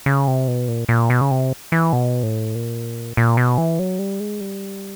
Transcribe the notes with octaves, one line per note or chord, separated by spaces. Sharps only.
C#3
C3
B2
A#2
A#2
B2
C#3
C3
E3
B2
A2
A#2
A#2
B2
E3
F#3
G3
G#3
G3